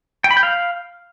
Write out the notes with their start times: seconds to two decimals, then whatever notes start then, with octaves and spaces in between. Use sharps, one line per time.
0.24 G5
0.31 B5
0.37 G5
0.43 F5